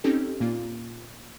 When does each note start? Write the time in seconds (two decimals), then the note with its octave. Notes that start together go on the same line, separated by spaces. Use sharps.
0.04 C4 C#4 D#4 G4 A4
0.40 A#2 A#3 F4